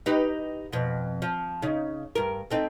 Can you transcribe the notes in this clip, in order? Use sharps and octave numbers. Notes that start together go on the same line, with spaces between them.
D#4 G4 B4
F2 B2
F3
C#3 D#4
G2 A#4
A3 C4 D#4